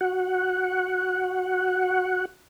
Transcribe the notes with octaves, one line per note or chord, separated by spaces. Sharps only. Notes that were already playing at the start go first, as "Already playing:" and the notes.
F#4 F#5